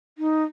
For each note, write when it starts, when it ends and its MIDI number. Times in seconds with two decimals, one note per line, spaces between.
0.18 0.43 63